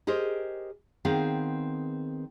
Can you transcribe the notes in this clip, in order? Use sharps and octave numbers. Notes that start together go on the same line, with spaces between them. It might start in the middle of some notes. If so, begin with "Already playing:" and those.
G4 G#4 A#4 C5 D#5
D#3 B3 C4 G#4 F5